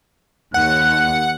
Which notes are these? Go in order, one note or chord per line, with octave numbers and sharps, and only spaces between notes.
D#2 F#5 F#6